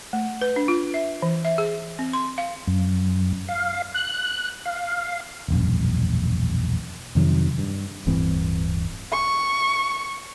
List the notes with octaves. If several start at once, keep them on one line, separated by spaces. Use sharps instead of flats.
A3
B4
D4
F4
E5
E3
E5
G#4
C4
C6
F5
F#2
F5
F#6
F5
E1 A#1 F#2
F2 C3 D#3 F#3
G2
D1 G2 E3 C4
C#6